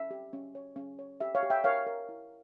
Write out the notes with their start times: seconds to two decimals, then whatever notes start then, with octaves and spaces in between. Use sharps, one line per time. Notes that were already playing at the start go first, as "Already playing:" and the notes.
Already playing: C#4 E5
0.11 G4
0.33 C#4
0.55 C#5
0.76 C#4
0.99 C#5
1.20 G4 E5
1.35 C#5 F5
1.43 G4
1.50 E5 G5
1.64 A#4 C#5 F5
1.87 A#4
2.09 E4